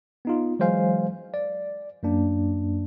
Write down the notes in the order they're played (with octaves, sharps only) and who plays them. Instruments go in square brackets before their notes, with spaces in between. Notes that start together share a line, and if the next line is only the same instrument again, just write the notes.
[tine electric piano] B3 D#4 F4
E3 F#3 G#3 C5 F5 G#5
D5
F#2 A#3 D4